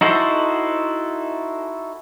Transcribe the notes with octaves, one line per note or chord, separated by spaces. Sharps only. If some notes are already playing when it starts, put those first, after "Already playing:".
D#4 E4 F#4 A4 C5